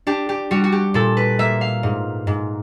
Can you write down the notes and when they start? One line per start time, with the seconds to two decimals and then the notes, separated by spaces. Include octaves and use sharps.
0.07 D4 G4
0.29 G4
0.51 G3 F#4
0.64 F#4
0.72 G4
0.94 A#2 A4
1.17 B4
1.39 A#3 E5
1.61 F5
1.83 G#2
2.27 G#2